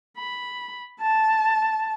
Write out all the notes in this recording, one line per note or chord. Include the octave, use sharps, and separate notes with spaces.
B5
A5